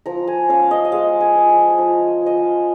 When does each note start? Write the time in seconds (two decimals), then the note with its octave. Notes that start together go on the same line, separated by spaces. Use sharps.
0.06 F3 A#5
0.27 G#5
0.49 C#4 F5
0.71 D#5
0.85 D#5
0.92 G#3 F5
1.21 G#5
1.35 F3
1.50 G#5
1.70 G#5
1.78 F3 A#5
2.07 G#5
2.22 F3 D#5
2.37 F5